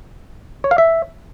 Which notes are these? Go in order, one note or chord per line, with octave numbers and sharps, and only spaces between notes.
C#5
F5
E5